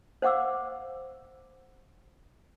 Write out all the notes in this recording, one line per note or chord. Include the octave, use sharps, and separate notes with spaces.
C5 F5 F#5 D6 E6